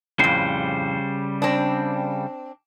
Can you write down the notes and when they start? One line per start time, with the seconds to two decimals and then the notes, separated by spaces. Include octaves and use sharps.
0.19 F2 A2 C#3 G3 C5
1.42 C4 D4